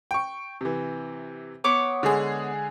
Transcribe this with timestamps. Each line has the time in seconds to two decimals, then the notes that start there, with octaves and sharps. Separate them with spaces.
0.11 G5 C#6
0.61 C3 E3
1.64 B3 C#5 D6
2.03 D3 G#3 G#4